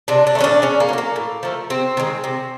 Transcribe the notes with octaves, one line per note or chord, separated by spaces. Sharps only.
C3 D4
D4
A3
E3 C#4
D4
C#3 C#4
A#3
F#3 A3
A#3
A2
F3 A3
C3 C4
D#3 G#3
C3